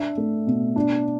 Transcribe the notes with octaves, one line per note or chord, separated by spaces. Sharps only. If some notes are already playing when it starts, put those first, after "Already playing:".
Already playing: D4 E5
A3
B2
D4